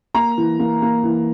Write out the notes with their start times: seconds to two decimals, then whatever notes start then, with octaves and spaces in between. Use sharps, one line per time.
0.15 A#3 A#5
0.38 E3
0.59 A#3
0.82 A#3
1.04 E3